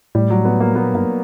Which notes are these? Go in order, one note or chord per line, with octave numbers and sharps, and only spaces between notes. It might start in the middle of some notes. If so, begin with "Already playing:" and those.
A2 G3
F#3
B3
A#3
A#2 B3
G2 A#3